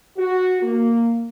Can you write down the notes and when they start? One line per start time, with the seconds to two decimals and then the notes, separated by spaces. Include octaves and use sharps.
0.17 F#4
0.63 A#3